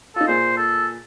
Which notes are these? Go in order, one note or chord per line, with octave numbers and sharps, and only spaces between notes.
D#4 F4 A4
A#2 G#4 C5
A4